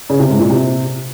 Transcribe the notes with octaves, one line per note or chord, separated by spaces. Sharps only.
C#3
C3
G#2
A#2
C3